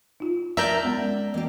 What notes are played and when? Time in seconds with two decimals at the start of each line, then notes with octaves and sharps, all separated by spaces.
0.20 D#4 F4
0.57 A#4 D5 E5 A5 A#5 G6
0.83 G#3 B3 C#4
1.34 E3 A#3 G4